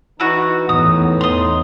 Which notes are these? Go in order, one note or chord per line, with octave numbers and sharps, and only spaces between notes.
E3 D#4 E4 F#4 C#6
E2 A2 E3 B3 D#4 D#6
C6 D#6